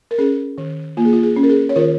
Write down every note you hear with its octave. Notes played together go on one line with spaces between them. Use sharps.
A#4
C#4 G#4
D#3
A#3 F4
G#4
F4
G#4
C#4
A#4
G#4
C#5
D#3 F4 A#4